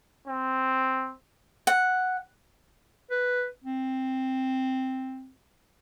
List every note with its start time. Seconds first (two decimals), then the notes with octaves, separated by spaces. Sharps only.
0.27 C4
1.67 F#5
3.11 B4
3.64 C4